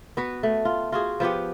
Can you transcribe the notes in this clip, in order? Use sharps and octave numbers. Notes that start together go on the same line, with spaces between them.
B3 F#4 B4
A3
F4
F4 F#4 G#4
F3 B3 G4 F#5